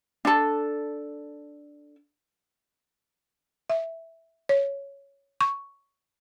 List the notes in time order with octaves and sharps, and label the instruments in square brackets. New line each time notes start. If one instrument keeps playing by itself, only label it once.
[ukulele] D4 A4
[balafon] E5
C#5
C#6